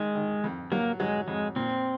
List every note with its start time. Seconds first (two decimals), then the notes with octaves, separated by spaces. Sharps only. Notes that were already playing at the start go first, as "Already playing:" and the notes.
Already playing: D#3 G#3
0.15 D#3
0.44 F2
0.72 F#3 A#3
1.00 F#3 G#3
1.28 F2 G#3
1.56 A#2 C4